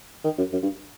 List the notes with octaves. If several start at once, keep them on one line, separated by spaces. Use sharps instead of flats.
D#3
F#2
F#2
G2